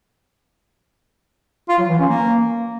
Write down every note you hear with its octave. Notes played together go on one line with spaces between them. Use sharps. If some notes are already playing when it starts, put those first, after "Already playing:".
F4
F#3
E3
C#4
A#3